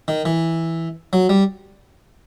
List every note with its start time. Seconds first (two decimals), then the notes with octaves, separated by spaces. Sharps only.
0.08 D#3
0.25 E3
1.13 F#3
1.29 G3